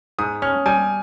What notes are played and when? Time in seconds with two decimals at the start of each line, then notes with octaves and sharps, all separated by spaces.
0.19 G#2 D#6
0.42 C#4 F6
0.66 G3 G#5